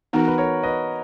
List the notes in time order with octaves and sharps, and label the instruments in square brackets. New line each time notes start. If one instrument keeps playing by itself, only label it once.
[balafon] E3 B3 D#4 [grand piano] F#4 A#4
[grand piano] B4
A#4 C#5
B4 D#5